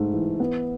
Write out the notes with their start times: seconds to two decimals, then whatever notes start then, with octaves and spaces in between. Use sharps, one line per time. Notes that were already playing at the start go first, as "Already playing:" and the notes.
Already playing: G#2 A3
0.14 E3
0.40 B3